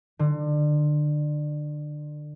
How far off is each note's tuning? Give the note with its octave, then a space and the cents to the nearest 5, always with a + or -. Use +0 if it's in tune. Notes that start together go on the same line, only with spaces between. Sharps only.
D3 +25